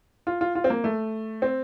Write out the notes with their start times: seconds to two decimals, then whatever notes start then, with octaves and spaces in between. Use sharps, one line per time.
0.27 F4
0.41 F4
0.55 F4
0.64 C4
0.70 A#3
0.84 A3
1.42 C4